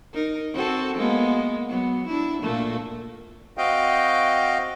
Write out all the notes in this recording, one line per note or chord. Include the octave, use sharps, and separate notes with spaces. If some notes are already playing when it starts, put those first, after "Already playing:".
D#4 A#4
C4 F#4 A4
G#3 A#3 B3
F#3 B3
D4 E4
A#2 A3 A#3
C4 F#4 D#5 F5 G5